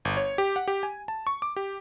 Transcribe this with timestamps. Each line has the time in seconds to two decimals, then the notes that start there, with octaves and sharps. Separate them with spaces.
0.05 G1
0.17 C#5
0.38 G4
0.56 F#5
0.68 G4
0.83 G#5
1.08 A5
1.27 C#6
1.42 D6
1.56 G4